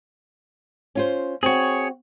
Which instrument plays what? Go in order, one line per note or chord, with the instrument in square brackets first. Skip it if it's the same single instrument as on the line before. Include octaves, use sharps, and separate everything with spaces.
[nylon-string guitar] C#4 F4 C5
[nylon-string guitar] C4 F#4 [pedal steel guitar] G#4 C#5